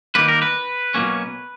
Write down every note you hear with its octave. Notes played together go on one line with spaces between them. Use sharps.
D#3 G3 A#3 B4
A#4
B4
B2 F#3 A#3 C#4